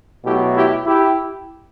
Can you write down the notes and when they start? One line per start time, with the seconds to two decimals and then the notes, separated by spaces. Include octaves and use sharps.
0.24 B2 F#3 A3 E4 G4
0.55 E4 G4
0.85 E4 G4